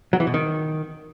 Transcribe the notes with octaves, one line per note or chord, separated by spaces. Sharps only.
F#3
E3
B2
D#3